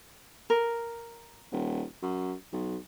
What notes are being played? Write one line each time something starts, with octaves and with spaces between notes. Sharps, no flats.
A#4
D#1
F#2
B1